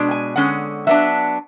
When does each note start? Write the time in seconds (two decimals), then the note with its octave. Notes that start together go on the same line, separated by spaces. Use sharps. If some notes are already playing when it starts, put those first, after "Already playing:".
Already playing: B2 G#3 D4
0.11 G#5
0.36 D3 G#3 C#4 F#5
0.87 F#3 B3 D4 E5